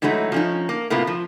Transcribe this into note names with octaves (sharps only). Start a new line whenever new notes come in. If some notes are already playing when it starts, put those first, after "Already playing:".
G#2 E3 F#3 A3 D#4
F3 C#4 D#4
A#3
A2 C3 A#3 B3 F4
F3